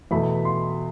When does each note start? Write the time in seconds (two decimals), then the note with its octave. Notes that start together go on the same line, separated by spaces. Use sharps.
0.11 E2 B2 A3 B5
0.45 C6